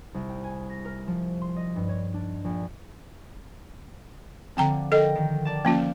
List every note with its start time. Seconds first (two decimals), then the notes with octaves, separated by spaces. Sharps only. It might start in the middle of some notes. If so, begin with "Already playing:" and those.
0.14 C2
0.29 G5
0.44 G#5
0.69 A#6
0.85 A#4
1.08 F3
1.42 C6
1.56 D#5
1.76 G2
1.88 C#5
2.14 D4
2.44 A#1
4.57 D3 F3 C4 G5 A#5
4.92 A4 A#4 D#5 G5
5.15 D#3
5.45 D5 A5
5.65 F3 A#3 C#4 F4